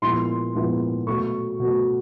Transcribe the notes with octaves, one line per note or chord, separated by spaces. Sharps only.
A#2 F3 G#3 B3 E4 C6
A#2 F3 G#3 B3 E4
B2 F#3 A3 C#6
B2 F#3 A3